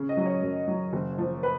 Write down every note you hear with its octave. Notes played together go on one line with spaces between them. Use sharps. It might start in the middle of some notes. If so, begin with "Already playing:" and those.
Already playing: C#3
D#5
F#3
C#5
F#2
F#3
F#1
F3
B4